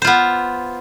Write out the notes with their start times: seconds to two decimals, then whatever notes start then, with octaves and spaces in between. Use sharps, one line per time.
0.02 C5
0.04 F4
0.07 B3